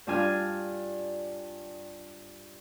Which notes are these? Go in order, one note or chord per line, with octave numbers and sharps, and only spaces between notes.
G2 D4 F4 G#5 F6